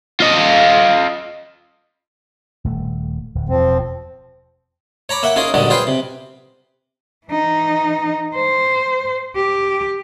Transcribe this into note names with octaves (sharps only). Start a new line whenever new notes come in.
F4 D#5
D#1 A3
D1
E1 F3 C4
C#5 A#5 B5 D6
A#3 E5 F#5
C#4 D#4 F4 G#4 A#4
G2 A#2 D3 F#3 G#3
F4 G#4 B4 C5 F5 G5
C3
E3 D#4
C5
G4